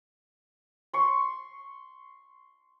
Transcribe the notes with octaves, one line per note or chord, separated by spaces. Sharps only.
C6 C#6